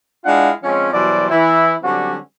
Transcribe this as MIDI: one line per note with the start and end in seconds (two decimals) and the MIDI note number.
0.25 0.51 56
0.25 0.51 62
0.25 0.51 64
0.25 0.51 65
0.25 0.51 77
0.25 0.51 78
0.63 0.89 53
0.63 0.89 56
0.63 0.89 60
0.63 0.89 61
0.92 1.28 47
0.92 1.28 52
0.92 1.28 54
0.92 1.28 55
0.92 1.28 72
0.92 1.28 74
1.30 1.72 52
1.30 1.72 64
1.83 2.16 50
1.83 2.16 54
1.83 2.16 55
1.83 2.16 60
1.83 2.16 61
1.83 2.16 66